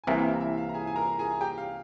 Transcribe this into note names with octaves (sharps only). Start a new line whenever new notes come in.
G#5
C2 C3 E3 A#3 G4 G5
E5
F5
E5
F5
A#5
G#4 G#5
G#5
A#4 A#5
G#4 G#5
G4 G5
F5